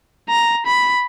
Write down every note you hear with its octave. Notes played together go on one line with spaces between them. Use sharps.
A#5
B5